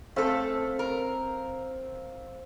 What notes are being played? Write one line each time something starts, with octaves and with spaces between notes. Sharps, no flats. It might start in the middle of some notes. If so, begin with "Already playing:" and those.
A3 C4 A4 F5
A#4